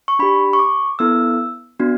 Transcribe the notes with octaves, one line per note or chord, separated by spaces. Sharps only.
C#6
D4 G4 B5
C#6
D6
B3 E4 A4 E6
B3 D4 F#4